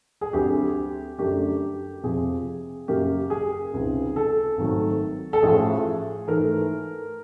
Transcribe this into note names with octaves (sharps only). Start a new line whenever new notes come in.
G#4
D2 D3 F#3 A3 C4 G4
F#2 D3 F#3 A3 D4 G4
F2 C3 F3 G#4
F#2 C#3 F#3 A#3 G4
G#4
C#2 C3 D#3
A4
G#1 G#2 D#3 F#3 A3
A4
A1 A2 F3 G#4
G#2 E3 A3 A#4